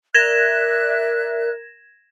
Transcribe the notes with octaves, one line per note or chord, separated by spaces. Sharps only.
A#4 D5 E5 F#6 G#6 A#6 E7